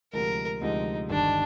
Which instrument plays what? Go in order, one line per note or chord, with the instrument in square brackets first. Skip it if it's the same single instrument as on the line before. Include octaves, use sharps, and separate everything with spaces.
[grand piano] D2 C3 F3 G#3 [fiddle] A#4
[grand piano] D2 C3 F3 G#3 [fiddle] D#4
[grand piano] G1 G2 D#3 [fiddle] D4